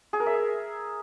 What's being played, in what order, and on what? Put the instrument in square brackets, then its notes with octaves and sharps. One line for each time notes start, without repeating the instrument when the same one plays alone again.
[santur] G#4
A#4
E5